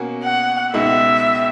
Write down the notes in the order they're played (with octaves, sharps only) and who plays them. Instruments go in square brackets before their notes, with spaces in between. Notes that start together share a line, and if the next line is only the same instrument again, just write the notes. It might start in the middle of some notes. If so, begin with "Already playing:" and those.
Already playing: [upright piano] B2 A#3 C#4 F#4
[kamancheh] F#5
[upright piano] C#2 B2 G#3 D#4 [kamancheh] E5